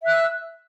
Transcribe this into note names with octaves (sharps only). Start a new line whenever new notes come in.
E5 E6 F#6